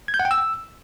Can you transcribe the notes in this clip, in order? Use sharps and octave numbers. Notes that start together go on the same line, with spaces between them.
G#6
G6
F#5
G5
E6